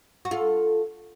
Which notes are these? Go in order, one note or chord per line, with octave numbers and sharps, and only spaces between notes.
F#4
F4 A4